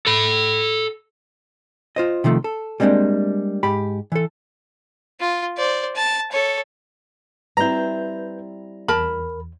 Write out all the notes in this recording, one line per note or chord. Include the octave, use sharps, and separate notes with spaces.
A4 B5
F4 C5 D#5
C3 D#3 F3 A3
A4
G3 G#3 A#3 C4 D4
G#2 G4 B5
E3 A4
F4
C5 D5
A5
A4 C#5
G3 C4 E4 B4 A#5 G6
E2 A#4 A5 B5